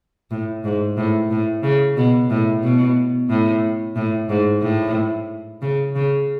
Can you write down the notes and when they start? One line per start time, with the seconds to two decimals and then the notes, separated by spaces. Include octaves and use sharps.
0.31 A2
0.64 G#2
0.97 A2
1.31 A2
1.63 C#3
1.97 B2
2.30 A2
2.63 B2
3.30 A2
3.96 A2
4.29 G#2
4.62 A2
5.62 C#3
5.95 C#3